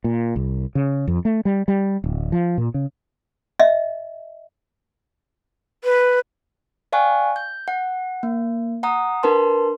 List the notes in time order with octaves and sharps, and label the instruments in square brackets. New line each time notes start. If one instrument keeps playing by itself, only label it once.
[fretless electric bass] A#2
C2
C#3
F2
A3
G3
G3
D1
F3
A#2
C#3
[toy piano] D#5 E5
[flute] B4
[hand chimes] D5 F5 G5 G#5 C#6 F#6
G6
F#5
A#3
F#5 A#5 D#6
D4 A#4 B4 A5 C6